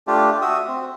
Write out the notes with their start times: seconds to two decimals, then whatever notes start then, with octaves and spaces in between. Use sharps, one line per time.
0.07 A3 D4 F4 G4
0.41 F#4 E5 D#6
0.67 C4